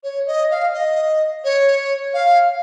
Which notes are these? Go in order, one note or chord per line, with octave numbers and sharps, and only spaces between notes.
C#5
D#5
F5
D#5
C#5
F5